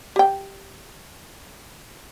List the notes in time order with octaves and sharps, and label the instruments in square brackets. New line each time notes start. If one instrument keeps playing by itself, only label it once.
[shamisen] G4 G5